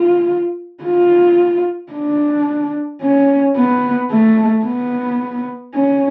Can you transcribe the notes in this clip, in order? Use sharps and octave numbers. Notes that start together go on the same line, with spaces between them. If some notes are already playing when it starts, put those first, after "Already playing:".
Already playing: F4
F4
D4
C#4
B3
A3
B3
C#4